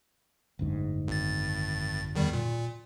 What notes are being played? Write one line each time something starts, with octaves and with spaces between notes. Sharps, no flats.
F#1 D2 G#2
G#1 A6
E2 D#3 G3
A#2